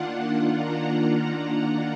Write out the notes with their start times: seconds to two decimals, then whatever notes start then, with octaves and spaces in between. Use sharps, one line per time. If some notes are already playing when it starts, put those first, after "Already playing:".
Already playing: D#3 A#3 D4 F4 F#5
0.56 A#5
1.20 F#5